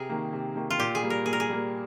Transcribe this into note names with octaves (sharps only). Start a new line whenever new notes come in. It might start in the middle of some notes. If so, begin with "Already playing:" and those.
Already playing: C3 G#4 A#4
D#3 A#3
C3
D#3 A#3
F4
A#2 G4
G#4
G3 A#3
A#4
A#2 G#4
A#4
G#4
G3 A#3